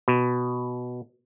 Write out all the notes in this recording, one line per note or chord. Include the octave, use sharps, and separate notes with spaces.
B2